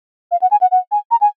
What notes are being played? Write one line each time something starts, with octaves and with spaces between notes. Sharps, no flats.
F5
F#5
G#5
F#5
F#5
G#5
A#5
G#5